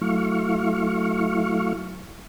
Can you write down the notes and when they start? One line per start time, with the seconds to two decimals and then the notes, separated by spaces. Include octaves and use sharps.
0.01 F#3 A3 E4 F5 C#6